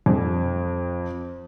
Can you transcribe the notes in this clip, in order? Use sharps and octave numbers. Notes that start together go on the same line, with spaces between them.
F2